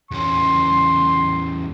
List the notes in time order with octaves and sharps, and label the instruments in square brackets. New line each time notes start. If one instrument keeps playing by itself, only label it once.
[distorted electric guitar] E2 C#4 [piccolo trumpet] C6